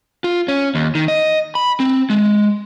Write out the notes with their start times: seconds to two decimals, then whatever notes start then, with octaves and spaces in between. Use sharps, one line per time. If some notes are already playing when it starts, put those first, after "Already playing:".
0.24 F4
0.48 C#4
0.75 D#2
0.95 D#3
1.08 D#5
1.55 B5
1.80 C4
2.10 G#3